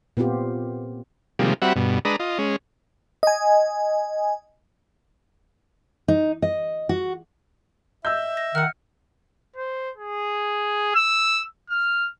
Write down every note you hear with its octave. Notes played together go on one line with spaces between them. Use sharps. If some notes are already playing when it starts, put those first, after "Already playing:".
A#2 B3 C4 F4 G4
C3 D#3 F3 G3 G#3 A#3
G3 C4 F#4 E5 F#5 B5
G2 B2
G#3 D4 B4 A#5 D#6
F4 D#5
G#3 C#4
D#5 G#5
D#4
D#5
F#4
D#5 E5 E6 G6
A#6
D#3 F#5 F6 C#7
C5
G#4
E6
F6